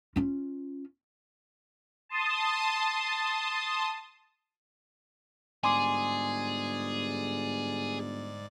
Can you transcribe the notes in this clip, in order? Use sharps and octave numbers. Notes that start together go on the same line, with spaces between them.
C#4 F4
A5 C6 D#6
G1 G#2 G#4 D5 G#5 C6 D6